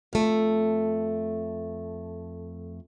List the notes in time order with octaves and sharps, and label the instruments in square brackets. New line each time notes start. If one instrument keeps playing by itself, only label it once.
[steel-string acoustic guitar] F2 A3